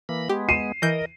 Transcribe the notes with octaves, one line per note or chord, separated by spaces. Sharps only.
E3 A#3 B5
G#3 B3 G4
C7 D#7 E7
E3 A#4 D#5 G6